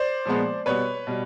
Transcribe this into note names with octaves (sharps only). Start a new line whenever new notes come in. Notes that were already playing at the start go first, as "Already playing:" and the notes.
Already playing: C5 D5
A#2 F3 G#3 B3
B2 G3 B3 B4 C#5
B2 G3